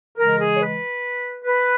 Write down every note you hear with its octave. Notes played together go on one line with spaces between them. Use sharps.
C#3 E3 G#3 A#4
G#4
C#5
B4
B4